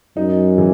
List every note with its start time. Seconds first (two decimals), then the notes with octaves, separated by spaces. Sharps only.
0.17 F#2 D#4
0.58 E3